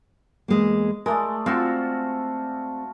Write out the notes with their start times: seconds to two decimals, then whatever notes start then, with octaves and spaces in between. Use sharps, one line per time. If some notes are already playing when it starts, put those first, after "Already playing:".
0.48 E2 G#3 A#3
1.06 G#3 A3 A#4 D5
1.46 C4 F4 F#4 A4